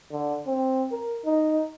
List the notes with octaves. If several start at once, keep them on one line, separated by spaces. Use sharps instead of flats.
D3
C4
A#4
D#4